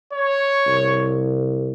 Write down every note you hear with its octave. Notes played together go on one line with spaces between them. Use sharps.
C#5
C2